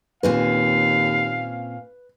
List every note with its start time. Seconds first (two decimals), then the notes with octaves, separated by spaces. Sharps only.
0.23 D#2 A#2 C4 C#4 B4 F5